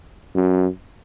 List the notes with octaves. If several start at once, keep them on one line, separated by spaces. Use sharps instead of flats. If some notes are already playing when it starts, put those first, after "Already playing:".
F#2